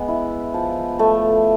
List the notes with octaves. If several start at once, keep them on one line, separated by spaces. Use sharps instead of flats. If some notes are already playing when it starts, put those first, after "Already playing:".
Already playing: G#3 B3
E4
F3
A3